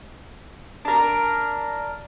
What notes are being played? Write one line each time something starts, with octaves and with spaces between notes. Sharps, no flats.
D4 A#4